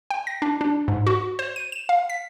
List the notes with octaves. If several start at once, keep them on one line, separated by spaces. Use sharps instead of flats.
G5
A#6
D4
D4
G#2
F#4
C5
D#7
E7
F5
B6